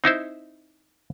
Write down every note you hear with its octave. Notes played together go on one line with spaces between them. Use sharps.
C4 D#4 E4 C5